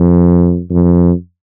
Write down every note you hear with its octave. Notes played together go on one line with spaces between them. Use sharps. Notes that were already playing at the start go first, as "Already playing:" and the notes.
Already playing: F2
F2